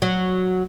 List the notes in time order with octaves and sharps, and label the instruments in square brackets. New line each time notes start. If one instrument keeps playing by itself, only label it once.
[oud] F#3